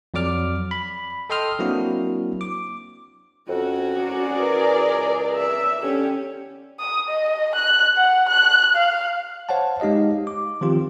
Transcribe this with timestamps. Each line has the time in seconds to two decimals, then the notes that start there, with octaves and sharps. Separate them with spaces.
0.14 F2 F#3 D5 D6 F6
0.71 B5
1.30 A4 D#5 G5 C6 D#6 F6
1.59 F#3 A#3 C4 D4 E4 F#4
2.41 D6
3.49 F2 C#4 F#4
3.98 G#4 A#4 D5
4.40 E3
4.92 C#2
5.36 E5
5.82 D3 C#4 G4
6.79 D#6
7.09 D#5
7.55 F#6
7.97 F#5
8.29 F#6
8.76 F5
9.49 C5 C#5 F5 F#5 A5
9.80 G#3 D#4 G4 D#5 F5
10.27 D6
10.61 D#3 F3 C4 F4 G4